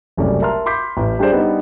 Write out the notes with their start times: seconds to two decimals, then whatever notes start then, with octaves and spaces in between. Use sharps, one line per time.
0.17 F#1 C2 A3 C#4 D5
0.42 A#4 E5 A5 A#5 C6 F6
0.66 B5 C6 D6 G6 B6
0.97 A1
1.19 G3 D4 G4 G#4 C5 D5
1.32 G3 B3 D4 D#4